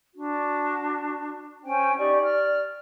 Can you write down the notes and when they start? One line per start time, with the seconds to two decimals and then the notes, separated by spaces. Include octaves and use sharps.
0.13 D4 F#4
1.64 C#4 C5 G5 G#5
1.96 D#4 G4 D5 C#6
2.21 D5 F6